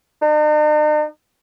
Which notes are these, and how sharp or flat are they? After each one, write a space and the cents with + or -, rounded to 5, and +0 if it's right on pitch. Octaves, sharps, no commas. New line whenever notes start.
D#4 -45